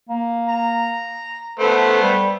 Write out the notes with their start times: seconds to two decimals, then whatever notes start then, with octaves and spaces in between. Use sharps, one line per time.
0.09 A#3
0.49 A#5
1.59 A3 B3 A4 C5
2.02 G3